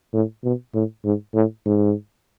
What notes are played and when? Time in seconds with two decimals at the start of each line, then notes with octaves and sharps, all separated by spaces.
0.14 A2
0.44 B2
0.74 A2
1.04 G#2
1.34 A2
1.66 G#2